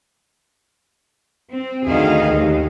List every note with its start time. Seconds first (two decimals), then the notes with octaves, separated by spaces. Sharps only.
1.52 C4
1.86 D2 D#3 G#4 D#5 F5
2.35 D#2